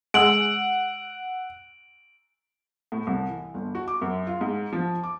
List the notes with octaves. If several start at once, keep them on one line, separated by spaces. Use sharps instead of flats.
G#3 F#5 E6 D7 F#7
A2
C2
E3
G1
F#4
D6
F#2
F4
G#2
F3
D6